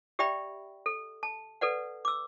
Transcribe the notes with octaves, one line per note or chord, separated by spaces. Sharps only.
G4 D5 E5 G5 B5
A4
A5
A4 B4 D5 F#5
D6 E6